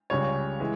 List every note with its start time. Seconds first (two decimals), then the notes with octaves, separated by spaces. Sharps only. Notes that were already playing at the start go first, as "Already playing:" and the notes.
0.10 C#2 C#3 G3 C#5
0.60 E3 G#3